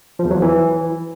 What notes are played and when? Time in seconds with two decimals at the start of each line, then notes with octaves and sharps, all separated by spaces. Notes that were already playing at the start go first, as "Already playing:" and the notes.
0.19 F3
0.25 E2
0.31 F#3
0.36 F3
0.42 E3